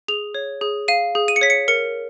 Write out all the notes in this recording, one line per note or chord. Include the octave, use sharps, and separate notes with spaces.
G#4 F7
C#5
G#4
F5 D#7
G#4
D#7
C#7
C#5 B6
C#7
A#4 C#7